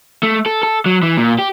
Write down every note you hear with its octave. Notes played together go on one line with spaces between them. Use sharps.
A3
A4
A4
F#3
E3
A#2
G4